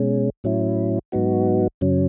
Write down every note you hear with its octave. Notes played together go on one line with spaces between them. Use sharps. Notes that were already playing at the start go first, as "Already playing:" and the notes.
Already playing: B2 G#3 C#4
A2 F#3 C#4 E4
G#2 F#3 B3 D#4 F#4
F#2 C#3 F#3 C#4